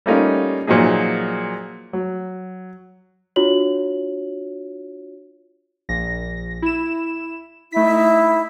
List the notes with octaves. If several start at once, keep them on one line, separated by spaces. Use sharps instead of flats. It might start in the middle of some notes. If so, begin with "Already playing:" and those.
G3 A3 A#3 C#4 D#4 F4
A#2 F3 F#3 D#4 G#4
F#3
D4 F4 F#4 C#5 F#7
A#1 A#6
E4 E7
A3 D#4 E4 B6